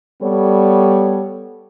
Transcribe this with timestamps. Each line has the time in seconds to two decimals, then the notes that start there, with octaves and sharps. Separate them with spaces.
0.23 G3 B3 A4 C#5 D5